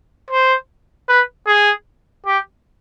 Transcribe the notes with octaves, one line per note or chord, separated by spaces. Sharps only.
C5
B4
G#4
G4